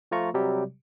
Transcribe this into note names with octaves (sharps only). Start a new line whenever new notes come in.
F3 A3 F4 A#5 C#6
C3 F#3 G3 G4